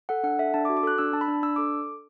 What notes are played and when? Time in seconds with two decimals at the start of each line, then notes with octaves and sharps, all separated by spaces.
0.09 A4 F#5
0.24 D4 F#5
0.39 A4 E5
0.54 D4 A5
0.65 D6
0.69 F#4
0.77 D6
0.83 A4 F#6
0.98 D4 E6
1.13 D4 A5
1.21 B5
1.28 D4
1.43 D4 E6
1.56 A4 D6